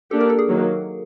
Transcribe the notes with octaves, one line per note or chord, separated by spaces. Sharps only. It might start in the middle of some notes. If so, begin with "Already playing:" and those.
A#3 D4 G4 A4
A#4
A4
G#4
D#3 F#3 A#3